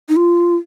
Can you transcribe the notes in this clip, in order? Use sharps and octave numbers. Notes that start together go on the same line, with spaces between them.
D#4
F4